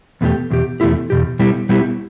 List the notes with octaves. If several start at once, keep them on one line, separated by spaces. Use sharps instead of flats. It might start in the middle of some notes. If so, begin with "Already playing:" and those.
E2 B2 A3 E4 G4
E2 B2 G4
E2 B2 A3 E4 G4
E2 B2 G4
B2 G3 B3 E4 G4
B2 G3 B3 E4 G4